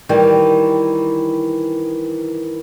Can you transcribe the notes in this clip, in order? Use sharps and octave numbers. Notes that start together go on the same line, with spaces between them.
D#3 E3 G3